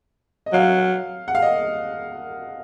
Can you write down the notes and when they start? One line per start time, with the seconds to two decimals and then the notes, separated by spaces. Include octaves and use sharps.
0.46 D#5
0.53 F#3 F5
1.28 F#5
1.35 F5
1.42 D#5